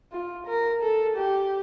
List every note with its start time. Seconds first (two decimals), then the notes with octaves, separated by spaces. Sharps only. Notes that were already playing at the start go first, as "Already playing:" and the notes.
0.12 F4
0.47 A#4
0.82 A4
1.16 G4